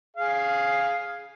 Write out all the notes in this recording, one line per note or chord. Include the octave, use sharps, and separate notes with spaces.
G#4 F5